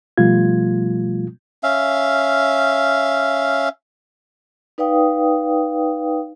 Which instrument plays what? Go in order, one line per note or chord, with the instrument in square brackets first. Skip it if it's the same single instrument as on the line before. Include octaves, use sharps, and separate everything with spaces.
[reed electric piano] B2 F3 G3 A3 F4 G#6
[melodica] C#4 E5 F5
[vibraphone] D#4 B4 D5 F5 G5 D#6